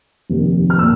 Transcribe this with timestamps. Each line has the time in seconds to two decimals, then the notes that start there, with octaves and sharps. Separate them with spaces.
0.30 F1 D#2 D#3
0.70 F6
0.79 A#2 E6